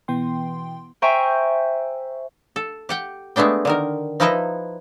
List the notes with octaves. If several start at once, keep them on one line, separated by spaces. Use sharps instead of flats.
B2 E3 B3 G5 C6
C5 E5 G5 G#5 A#5 C#6
A4
G4 F#5 G5
G#3 A3 B3 D4 G5
D3 D#3 A#4
F3 D#4 E4 B4 D#5 A#5